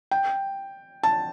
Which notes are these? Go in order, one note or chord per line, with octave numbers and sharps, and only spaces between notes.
G5
A5